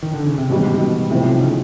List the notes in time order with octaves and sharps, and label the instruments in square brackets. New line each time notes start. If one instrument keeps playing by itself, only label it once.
[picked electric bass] D#3
D3
C#3
C3
[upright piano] A1 G#2 D#3 G3 [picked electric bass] B2
[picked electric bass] C3
B2
[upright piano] B1 A2 F3 [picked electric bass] C3
[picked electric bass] C#3